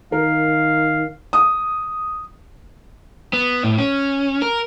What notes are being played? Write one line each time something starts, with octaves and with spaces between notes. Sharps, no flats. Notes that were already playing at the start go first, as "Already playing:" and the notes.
D#3 A#4 F5
D#6
B3
A2
C#4
A#4